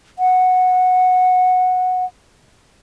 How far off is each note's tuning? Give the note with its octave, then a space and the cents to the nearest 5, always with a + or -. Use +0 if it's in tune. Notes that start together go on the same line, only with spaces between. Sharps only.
F#5 -10